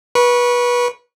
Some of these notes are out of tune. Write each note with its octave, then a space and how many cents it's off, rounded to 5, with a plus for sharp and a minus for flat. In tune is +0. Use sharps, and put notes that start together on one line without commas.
B4 -25 C#6 +0